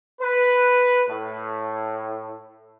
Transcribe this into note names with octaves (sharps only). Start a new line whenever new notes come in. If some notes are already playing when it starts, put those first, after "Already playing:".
B4
A2